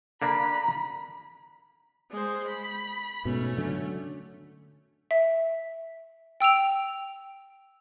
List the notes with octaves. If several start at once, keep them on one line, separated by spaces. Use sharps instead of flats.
D3 A#3 D4 A#5 B5
G#3 C5
B5
G#2 B2 A3 C#4
D3 F#3
E5
G5 E6 D7 F7